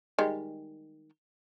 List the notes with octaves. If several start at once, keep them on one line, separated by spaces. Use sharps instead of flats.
D#3 G3 G#3